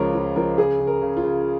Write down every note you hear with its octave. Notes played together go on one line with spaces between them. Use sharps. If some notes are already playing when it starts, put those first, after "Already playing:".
Already playing: C#2 C#3 F3 A#4 C#5
F3
F3 A#4
C#3 G#4
C#3
A#4
C#3
F4
C#3